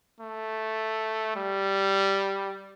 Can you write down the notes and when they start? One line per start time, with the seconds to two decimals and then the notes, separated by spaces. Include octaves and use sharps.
0.20 A3
1.36 G3